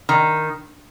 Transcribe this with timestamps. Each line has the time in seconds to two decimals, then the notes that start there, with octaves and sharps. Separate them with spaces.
0.09 D#3